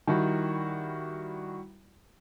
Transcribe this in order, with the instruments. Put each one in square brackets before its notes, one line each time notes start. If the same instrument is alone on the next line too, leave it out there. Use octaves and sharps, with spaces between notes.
[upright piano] D#3 [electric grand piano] G3 E4 F#4